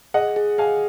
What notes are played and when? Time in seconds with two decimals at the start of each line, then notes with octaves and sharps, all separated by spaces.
0.14 G#4 D#5 F#5
0.36 G#4
0.58 G#4 F5 G#5